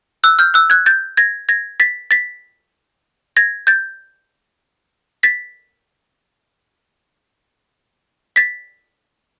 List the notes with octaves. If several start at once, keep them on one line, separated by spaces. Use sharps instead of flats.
E6 F#6
F6 G6
E6 F#6
F#6 G#6
G6 A6
G#6 A#6
G#6 A#6
A6 B6
A6 B6
G#6 A#6
G6 A6
A6 B6
A6 B6